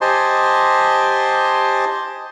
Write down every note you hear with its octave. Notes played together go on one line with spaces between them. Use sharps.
G4 C5 D#5 G#5 A5 C6